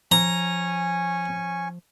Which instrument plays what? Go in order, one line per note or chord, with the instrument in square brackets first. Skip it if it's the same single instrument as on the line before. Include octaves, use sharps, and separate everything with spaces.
[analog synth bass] F3 [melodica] C#4 G#5 C#6 [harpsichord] A#5